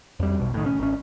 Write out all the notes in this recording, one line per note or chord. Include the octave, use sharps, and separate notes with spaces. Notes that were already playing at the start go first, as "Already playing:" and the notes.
F2 G3
B1 B2
A2 D#3
C#4
G#1 C#4